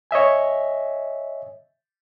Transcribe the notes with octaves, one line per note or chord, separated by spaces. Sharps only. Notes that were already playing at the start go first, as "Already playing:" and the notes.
C#5 D#5 E5 G#5